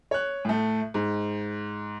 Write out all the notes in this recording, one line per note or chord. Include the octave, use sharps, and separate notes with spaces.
C#5 F#6
A2 A3
G#2